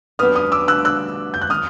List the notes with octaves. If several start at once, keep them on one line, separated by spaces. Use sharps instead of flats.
F#3 B3 D4 G4 B4 D#6 F6
D#6 F6
D6 E6
E6 F#6
E6 F#6
G6
F#6
D#6 F6